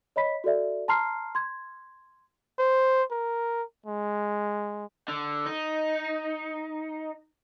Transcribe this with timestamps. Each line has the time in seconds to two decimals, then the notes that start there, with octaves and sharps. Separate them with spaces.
0.16 C#5 D#5 B5 B6
0.44 F#4 A4 D5 E5
0.88 A5 A#5 C6 F6 C7
1.35 C6 G#6
2.59 C5
3.11 A#4
3.86 G#3
5.08 D3
5.46 D#4